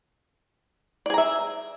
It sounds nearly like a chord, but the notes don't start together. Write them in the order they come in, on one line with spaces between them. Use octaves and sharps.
D5 G#4 A#5 E5